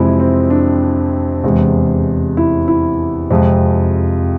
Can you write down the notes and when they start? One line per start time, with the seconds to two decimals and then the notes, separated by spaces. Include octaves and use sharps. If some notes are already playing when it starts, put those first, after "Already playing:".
Already playing: F2 C3 E3 G#3 E4
0.20 C4
0.50 D4
1.44 E2 C3 G#3
2.37 E4
2.68 E4
3.31 F2 C3 F3 G#3